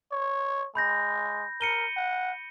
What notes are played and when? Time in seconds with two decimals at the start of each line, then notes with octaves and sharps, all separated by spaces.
0.12 C#5
0.75 G#3 B5 G6 A#6
1.61 A#4 C#7 D#7 G7
1.97 F#5